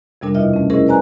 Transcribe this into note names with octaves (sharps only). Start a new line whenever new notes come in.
F2 C3 G3 D4 A#4
D#2 B2 E4 F4 D#5 E5
A3 C#4
C#4 E4 G#4 A#4 C5 D#5
B4 C5 D5 G#5 A#5 F#6